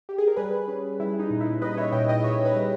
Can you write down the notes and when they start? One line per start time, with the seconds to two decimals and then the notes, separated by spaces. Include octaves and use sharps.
0.09 G4
0.18 G#4
0.27 A#4
0.36 G3 G#4 B4
0.68 C#4
1.00 G3 E4
1.20 D#4
1.30 A#2
1.41 E4
1.61 G3 B4 D#5
1.77 C#5 E5
1.92 A#2 D#5 G5
2.08 D#5 G5
2.24 A#2 C#5 E5
2.45 B4 D#5
2.56 G3